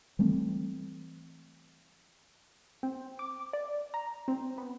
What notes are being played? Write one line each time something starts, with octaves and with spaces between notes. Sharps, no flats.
E3 G3 A3 C4
C4
D6
D5
A#5
C4
B3